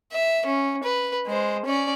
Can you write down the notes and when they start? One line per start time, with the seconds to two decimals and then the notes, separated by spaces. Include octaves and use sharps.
0.12 E5
0.46 C#4
0.83 B4
1.26 G#3 C5
1.65 C#4 D5